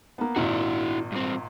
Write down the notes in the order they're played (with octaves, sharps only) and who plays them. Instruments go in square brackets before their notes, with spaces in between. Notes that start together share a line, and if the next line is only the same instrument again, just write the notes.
[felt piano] A#3 B3
[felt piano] G#1 A#2 [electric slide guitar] E4 F#4
[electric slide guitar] G2 C4